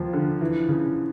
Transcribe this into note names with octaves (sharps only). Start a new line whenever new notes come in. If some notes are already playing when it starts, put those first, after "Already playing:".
Already playing: D#2 F3
D3
E3
C#3